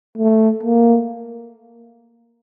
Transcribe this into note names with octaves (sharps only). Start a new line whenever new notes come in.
A3
A#3